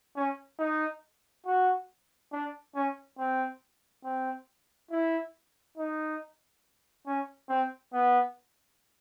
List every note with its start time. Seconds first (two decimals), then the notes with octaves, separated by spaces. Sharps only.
0.16 C#4
0.59 D#4
1.46 F#4
2.32 D4
2.75 C#4
3.18 C4
4.04 C4
4.91 E4
5.77 D#4
7.06 C#4
7.49 C4
7.93 B3